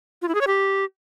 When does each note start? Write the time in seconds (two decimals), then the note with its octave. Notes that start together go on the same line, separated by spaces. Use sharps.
0.22 F4
0.28 E4
0.35 G#4
0.41 C#5
0.47 G4